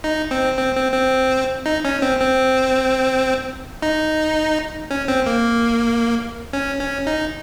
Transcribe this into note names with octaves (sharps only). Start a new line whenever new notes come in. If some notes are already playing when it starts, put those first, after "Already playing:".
D#4
C4
C4
C4
C4
D#4
C#4
C4
C4
D#4
C#4
C4
A#3
C#4
C#4
D#4